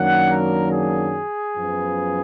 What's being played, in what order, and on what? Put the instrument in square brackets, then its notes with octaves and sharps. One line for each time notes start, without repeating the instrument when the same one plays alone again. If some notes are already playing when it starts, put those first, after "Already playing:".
Already playing: [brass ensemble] F#2 D#3 F#3 A#3 D4 F#5
A#4
G#4
F#2 F3 B3